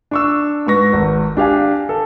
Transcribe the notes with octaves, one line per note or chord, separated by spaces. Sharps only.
D4 C#6 E6
G#2 B4 C#6 A#6
G#1
D4 G4 F5 G#5
A4